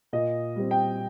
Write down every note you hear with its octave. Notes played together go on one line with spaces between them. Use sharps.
A#2 D#5
G3 C4
G5